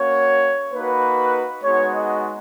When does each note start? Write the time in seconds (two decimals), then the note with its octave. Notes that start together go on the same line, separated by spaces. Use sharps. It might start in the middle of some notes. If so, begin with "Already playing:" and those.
Already playing: A#3 C#4 F#4 C#5
0.72 A#3 D#4 F#4 B4
1.63 G#3 B3 D#4 F#4 C#5
1.93 D#5